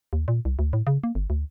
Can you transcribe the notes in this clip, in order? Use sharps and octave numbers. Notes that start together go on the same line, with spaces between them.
D#2
A#2
C2
D2
A2
C#3
A#3
G1
D2